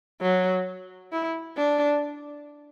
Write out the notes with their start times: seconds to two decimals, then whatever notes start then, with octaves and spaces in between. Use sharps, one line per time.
0.22 F#3
1.12 E4
1.57 D4